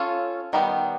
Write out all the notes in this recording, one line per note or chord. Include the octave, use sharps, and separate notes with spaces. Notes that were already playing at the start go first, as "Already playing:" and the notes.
Already playing: C#4 F4 A4
D#3 G3 B3